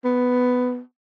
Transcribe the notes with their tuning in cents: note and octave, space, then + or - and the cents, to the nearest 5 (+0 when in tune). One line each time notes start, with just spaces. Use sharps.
B3 +10